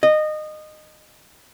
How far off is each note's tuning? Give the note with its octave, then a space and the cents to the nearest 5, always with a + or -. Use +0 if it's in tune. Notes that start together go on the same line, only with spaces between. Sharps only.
D#5 -20